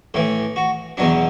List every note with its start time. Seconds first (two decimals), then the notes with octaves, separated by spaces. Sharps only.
0.14 A2 E3 G4
0.56 F#4
0.97 E2 B2 F#3 D4